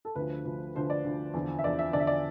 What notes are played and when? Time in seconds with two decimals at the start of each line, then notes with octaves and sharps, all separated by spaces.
0.05 A4
0.15 D2 D3 F3 B4
0.45 D2 D3 F3
0.75 D2 D3 F3 C5
0.90 D5
1.05 D2 D3 F3
1.34 E2 D3 F3
1.59 E5
1.64 E2 D3 F3 D5
1.79 E5
1.93 E2 D3 F3 D5
2.00 E5
2.07 D5